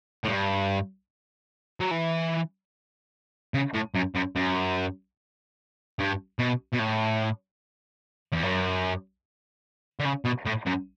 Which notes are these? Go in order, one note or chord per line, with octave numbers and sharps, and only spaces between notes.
A2
G2
F#3
E3
C#3
A2
F#2
F#2
F#2
G2
B2
B2
A2
E2
F#2
D3
C#3
B2
A2
F#2